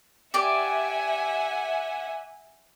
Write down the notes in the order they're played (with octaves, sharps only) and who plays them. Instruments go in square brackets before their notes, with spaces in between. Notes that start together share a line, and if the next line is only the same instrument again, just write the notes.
[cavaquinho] G4 D5 [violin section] E5 F#5 G#5